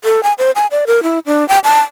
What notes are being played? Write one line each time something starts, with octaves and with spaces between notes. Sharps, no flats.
A4
G#5
C5
G#5
D5
A#4
E4
D4
G5
A5